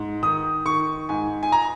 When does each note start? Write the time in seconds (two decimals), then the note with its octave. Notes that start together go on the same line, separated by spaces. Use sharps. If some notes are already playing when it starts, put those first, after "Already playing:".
Already playing: G#2
0.22 D#3 D#6
0.65 D#3 C#6
1.09 G#2 G#5
1.43 G#5
1.52 A#5